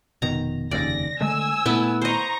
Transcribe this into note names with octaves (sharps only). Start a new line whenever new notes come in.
F1 B2 D#3 A#5
F1 D#2 C#3 D5 A#6
D3 G#3 A3 G#5 E6
A#2 A3 B3 E4
C5 D#5 A#5 C#6